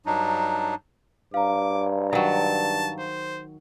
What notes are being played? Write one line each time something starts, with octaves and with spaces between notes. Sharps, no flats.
G2 F#3 D4 D#4
G2 F5 A#5 D6
D#3 F#3 A5
C5